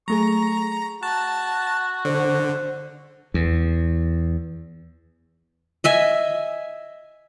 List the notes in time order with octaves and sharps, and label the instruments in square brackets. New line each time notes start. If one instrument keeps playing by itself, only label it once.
[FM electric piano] F#3 A3 G#4 [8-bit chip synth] A#5 [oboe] C#6
[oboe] F#4 [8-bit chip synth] A5 [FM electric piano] F#6
[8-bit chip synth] D3 [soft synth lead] C5
[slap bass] E2
[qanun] D#5 E5 G#5